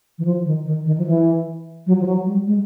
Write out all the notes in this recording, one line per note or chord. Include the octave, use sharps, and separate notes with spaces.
E3
F3
D#3
D#3
D#3
F3
E3
F#3
F3
F#3
G3
G#3